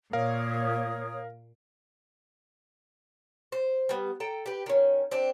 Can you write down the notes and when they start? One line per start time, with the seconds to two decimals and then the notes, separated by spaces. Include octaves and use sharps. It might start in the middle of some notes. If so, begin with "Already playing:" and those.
0.13 A#2 A#4 C#5 F5 D#6
3.52 C5
3.89 G3 B3
4.20 A4 G5 A#5
4.46 G4 B4
4.66 D#3 C#4
5.11 C4 D4 G4